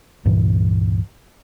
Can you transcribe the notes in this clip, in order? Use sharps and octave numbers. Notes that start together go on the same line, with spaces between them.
C#2 G2 A#2 E3